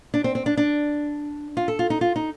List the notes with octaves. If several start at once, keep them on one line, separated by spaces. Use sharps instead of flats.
D4
C4
C4
D4
D4
F4
A4
F4
D#4
F4
D#4